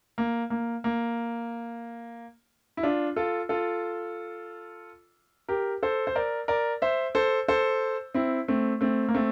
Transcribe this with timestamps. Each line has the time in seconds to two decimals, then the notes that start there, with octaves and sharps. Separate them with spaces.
0.18 A#3
0.50 A#3
0.84 A#3
2.77 E4
2.83 D4 F4
3.16 F4 A4
3.49 F4 A4
5.49 G4 A#4
5.83 A4 C5
6.07 C5
6.16 A#4 D5
6.48 A#4 D5
6.82 C5 E5
7.15 A4 C5
7.48 A4 C5
8.14 C4 E4
8.48 A3 C4
8.81 A3 C4
9.08 A#3
9.14 A3 C4